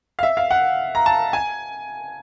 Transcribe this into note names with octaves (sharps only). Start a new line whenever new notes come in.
F5
E5
F5
F#5
A#5
A5
G#5